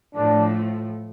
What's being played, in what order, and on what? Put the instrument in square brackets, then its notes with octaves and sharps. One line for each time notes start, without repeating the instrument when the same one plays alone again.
[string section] A2 F3 A3 [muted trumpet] D4